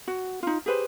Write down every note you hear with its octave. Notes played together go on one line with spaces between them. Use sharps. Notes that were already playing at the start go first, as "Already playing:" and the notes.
F#4
D#4 F4
G4 G#4 B4 C5